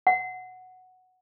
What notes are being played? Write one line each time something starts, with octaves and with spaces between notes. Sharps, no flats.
F#5